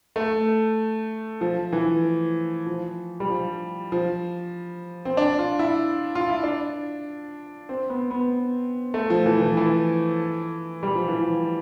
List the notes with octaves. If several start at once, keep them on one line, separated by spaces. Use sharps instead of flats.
A3
F3
E3
F3
G3
F3
F3
C4
D4
F4
E4
F4
E4
D4
C4
B3
B3
A3
F3
E3
E3
E3
G3
F3
E3
F3